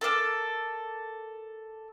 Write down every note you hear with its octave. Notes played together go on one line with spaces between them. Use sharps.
A4 A#4 D5 E6